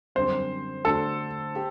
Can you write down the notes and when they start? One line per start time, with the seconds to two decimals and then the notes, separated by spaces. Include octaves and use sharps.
0.15 F#2 D3 G3 C4 C5
0.85 D3 A3 D4 F#4 A4
1.55 G4